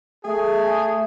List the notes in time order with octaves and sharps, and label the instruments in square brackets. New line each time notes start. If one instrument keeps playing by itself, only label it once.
[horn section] A3 G#4